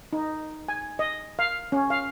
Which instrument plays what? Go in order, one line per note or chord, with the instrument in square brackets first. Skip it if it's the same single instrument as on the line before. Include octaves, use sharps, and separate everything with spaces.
[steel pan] D#4
G#5
D#5
F5
C#4
F5